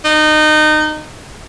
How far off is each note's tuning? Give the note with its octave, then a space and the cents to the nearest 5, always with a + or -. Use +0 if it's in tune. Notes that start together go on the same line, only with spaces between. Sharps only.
D#4 -25